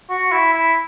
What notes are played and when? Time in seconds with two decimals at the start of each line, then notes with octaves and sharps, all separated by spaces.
0.10 F#4
0.32 E4
0.53 E4